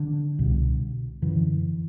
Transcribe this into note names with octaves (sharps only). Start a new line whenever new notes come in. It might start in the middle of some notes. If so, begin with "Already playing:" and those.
Already playing: D3
C2 B2
F#2 D3 E3